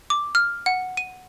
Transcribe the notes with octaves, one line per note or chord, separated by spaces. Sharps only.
D6
F6
F#5
D#7